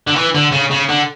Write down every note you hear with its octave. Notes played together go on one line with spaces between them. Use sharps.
D3
E3
D3
C#3
C#3
D3